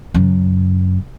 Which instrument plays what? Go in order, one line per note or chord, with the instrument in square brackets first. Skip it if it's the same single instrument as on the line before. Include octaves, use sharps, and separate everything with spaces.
[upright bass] F#2 C#3